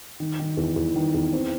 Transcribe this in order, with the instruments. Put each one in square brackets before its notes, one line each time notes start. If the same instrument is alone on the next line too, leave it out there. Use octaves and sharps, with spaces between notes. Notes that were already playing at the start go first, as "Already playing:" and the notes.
[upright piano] D#3
D#3
E2
E2
D#3
E2
C4